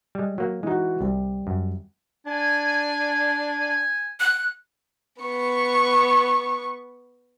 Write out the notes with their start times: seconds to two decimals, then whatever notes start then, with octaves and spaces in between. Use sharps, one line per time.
0.15 G3 G#3
0.38 F#3 A#3
0.63 E3 G#3 D#4 F#4
1.01 C2 G3
1.47 F#2
2.26 D4 G#5
4.20 F#6
5.22 B3 C#6